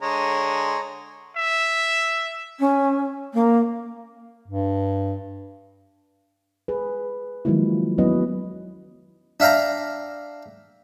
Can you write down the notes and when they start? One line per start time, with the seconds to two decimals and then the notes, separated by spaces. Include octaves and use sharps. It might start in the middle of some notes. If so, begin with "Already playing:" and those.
0.01 D3 G#3 C#5 A#5
1.37 E5
2.60 C#4
3.34 A#3
4.47 G2
6.68 G#4 B4
7.45 D#3 F3 F#3 G#3 A#3 E4
7.98 F#3 B3 C#4 E4 B4 D#5
9.40 D4 E5 F5 G5 A#5